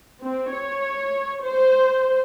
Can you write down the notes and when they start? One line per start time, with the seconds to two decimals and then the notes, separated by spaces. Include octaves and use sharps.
0.23 C4
0.55 C#5
1.44 C5